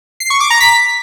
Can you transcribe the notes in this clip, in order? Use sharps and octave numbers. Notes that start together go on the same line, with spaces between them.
C7
C#6
D6
A#5
B6